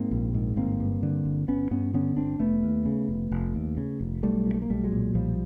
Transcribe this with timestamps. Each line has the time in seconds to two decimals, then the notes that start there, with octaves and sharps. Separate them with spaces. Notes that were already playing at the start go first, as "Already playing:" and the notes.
Already playing: G#2 A#3 C4
0.11 A#1
0.34 G#2
0.56 G1 A#3 C4
0.80 G2
1.03 D3
1.25 G1
1.48 G1 B3 C#4
1.71 G2 B3 C#4
1.94 D3 B3 C#4
2.17 G1 C4 D4
2.40 F1 A3 B3
2.63 D#2
2.86 C#3
3.09 F1
3.31 F1
3.55 D#2
3.77 C#3
4.01 F1
4.23 B1 G3 A3
4.46 A#2
4.54 A3
4.62 A#3
4.70 B1 G3 A3
4.84 F#3 G#3
4.92 A#2
5.14 B1 F3 G3